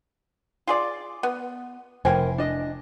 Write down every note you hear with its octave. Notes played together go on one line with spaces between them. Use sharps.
F4 G#4 D5
B3
F1 E3 A#4 C5 G5 G#5
D4 D#5